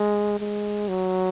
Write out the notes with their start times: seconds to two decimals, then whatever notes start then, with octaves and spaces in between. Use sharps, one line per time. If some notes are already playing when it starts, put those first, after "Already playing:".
Already playing: G#3
0.39 G#3
0.89 F#3